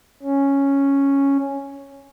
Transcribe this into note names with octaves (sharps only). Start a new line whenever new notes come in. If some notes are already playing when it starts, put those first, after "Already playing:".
C#4